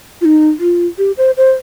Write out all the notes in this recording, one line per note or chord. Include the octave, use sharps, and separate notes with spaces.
F4
D#4
F4
G4
C5
C5